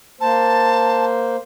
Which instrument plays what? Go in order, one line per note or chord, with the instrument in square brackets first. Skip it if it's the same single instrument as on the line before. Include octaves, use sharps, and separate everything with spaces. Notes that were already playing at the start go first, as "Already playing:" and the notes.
[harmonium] A#3 C5 [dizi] A5